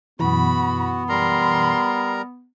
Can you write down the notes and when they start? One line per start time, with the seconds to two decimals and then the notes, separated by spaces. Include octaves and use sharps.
0.20 F#2 B2 E3 B3 F#4 B5
1.09 G3 A#4 A#5 C6